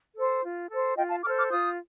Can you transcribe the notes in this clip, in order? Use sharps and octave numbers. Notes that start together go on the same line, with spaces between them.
A4
C5
F4
A4 C5
F4 D#5 G5
F5 A5
A4 C5 D6 F6
D6 F6
F4 D#6 G6